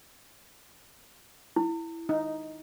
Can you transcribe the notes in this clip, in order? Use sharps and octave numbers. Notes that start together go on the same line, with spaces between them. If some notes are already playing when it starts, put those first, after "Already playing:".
E4
D#4